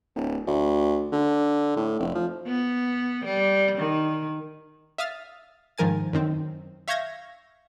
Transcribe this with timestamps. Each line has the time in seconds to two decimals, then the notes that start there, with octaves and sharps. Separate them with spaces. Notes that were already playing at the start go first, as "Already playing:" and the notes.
0.16 D1
0.47 D2
1.13 D3
1.77 A2
2.00 F1
2.15 F3
2.46 B3
3.24 G3
3.78 D#3
4.98 E5 F5 D#6 F6 A6
5.78 G#2 D#3 F3 A#4 G#5 A6
6.13 F#2 D#3 C4
6.88 E5 F5 C#6 G6 G#6 A#6